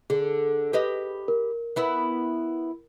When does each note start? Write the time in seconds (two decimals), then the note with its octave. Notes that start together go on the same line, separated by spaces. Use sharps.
0.10 D3 G#4
0.73 G4 B4 D#5
1.28 A#4
1.76 B3 E4 B4